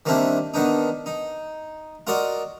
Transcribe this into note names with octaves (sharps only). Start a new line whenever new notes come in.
D#3 G3 A#3 C4 D4 E4
D#3 B3 D4 D#4
D#4
F4 F#4 A#4 D5 D#5